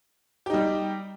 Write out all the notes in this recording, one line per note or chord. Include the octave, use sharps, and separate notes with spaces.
G3 D#4 G4